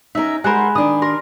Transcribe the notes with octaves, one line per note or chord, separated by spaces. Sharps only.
C#4 D#4 A#4 E5
G#3 A#4 C5 F#5 G#5 B5
D#3 D4 D#6
A#4 C6